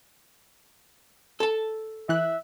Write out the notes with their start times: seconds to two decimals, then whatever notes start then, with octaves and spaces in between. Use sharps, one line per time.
1.40 A4 A5
2.09 E3 E5 F#6